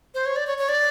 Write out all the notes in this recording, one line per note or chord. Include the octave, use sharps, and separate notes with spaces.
C5
C#5
D5
C#5
C#5
D5